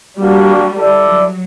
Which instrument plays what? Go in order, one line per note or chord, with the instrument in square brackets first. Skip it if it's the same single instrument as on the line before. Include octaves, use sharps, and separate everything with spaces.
[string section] G3 [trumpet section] A#3 D4 F#4
[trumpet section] E4 A4 D5
[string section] F#3